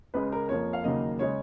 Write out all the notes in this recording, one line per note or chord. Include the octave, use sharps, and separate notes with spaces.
C#2 C#3 G#3 B4
A#4
F2 F3 A#3 C#5
F5
D#2 C#3 F#3 A#3 D#5
C#3 G#3 C#5